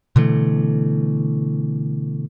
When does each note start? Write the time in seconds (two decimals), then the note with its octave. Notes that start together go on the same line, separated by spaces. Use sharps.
0.16 B2 D3 E3 A3